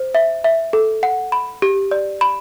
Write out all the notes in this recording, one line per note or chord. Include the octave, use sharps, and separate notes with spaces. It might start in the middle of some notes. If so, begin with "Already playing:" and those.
Already playing: C5
E5
E5
A4
F#5
B5
G4
D5
B5